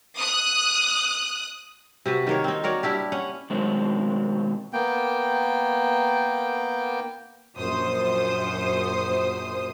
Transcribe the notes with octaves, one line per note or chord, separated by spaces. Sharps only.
D#6 F#6
C3 F#4 B4
D#3 A#3 C#5
C4 D#4
F#4 A#4 C#5 D5
G3 D4 E4 G4
C#4 F#5
B2 D#3 F#3 G#3 A3 C4
A#3 B3 G5
A#1 F#2 C5 D#6